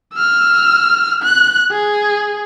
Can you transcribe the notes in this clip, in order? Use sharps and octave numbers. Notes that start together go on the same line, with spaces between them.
E6 F6
F#6
G#4